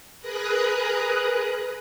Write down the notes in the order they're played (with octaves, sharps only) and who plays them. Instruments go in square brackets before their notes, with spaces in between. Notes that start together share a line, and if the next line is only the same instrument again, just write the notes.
[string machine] G#4 A#4 B4 A#5 D#6 F#6